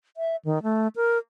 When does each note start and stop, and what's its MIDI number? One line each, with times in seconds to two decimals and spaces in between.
0.17 0.36 76
0.45 0.62 51
0.63 0.88 57
0.96 1.18 70